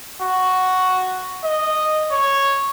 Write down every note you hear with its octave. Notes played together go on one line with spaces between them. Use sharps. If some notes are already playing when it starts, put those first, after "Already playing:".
F#4
D#5
C#5